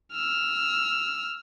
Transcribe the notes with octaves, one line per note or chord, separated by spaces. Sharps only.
E6 F6